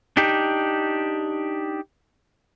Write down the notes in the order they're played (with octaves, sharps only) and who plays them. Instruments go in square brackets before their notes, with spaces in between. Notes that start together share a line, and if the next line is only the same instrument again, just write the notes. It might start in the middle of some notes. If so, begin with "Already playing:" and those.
[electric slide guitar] D4 D#4 G4